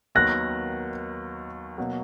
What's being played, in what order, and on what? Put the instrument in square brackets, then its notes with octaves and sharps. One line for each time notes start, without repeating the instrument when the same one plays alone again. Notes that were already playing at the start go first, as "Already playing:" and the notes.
[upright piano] D#2 D#3 F#3 B3 [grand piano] F#6 A#6
[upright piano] B2 F#3 A#3